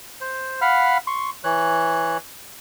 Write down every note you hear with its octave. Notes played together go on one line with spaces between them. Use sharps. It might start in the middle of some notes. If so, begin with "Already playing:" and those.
C5
F5 F#5 B5 F6
C6 C#6
E3 C#5 F#6